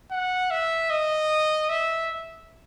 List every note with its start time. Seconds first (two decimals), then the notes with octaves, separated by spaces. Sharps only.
0.11 F#5
0.51 E5
0.90 D#5
1.69 E5